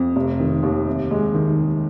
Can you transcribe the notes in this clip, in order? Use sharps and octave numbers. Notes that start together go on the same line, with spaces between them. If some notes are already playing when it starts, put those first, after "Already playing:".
Already playing: F2
F1
D#3
D#2
C3
G#3
D#3